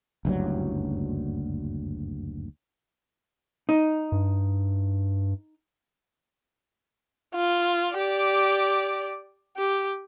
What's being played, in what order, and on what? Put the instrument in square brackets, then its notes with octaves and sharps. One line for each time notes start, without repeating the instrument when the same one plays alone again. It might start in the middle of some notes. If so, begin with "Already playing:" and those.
[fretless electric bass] F#1 D2 G2 F#3
[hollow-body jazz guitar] D#4
[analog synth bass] G2
[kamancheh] F4
G4 D5
G4